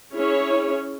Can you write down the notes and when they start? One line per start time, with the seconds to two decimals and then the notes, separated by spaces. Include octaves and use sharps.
0.13 C#4 E4 G#4 C#5